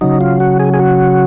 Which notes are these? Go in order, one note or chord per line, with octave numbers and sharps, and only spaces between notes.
C#3 F#3 D#4
F4
F#4
G#4
G#4
F#4